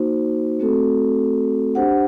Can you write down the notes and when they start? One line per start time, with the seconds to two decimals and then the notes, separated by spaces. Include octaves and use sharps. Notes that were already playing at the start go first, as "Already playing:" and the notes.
Already playing: A#3 D#4 F#4 C5
0.60 A3 C4 F#4 A4
1.75 D4 G4 C5 F#5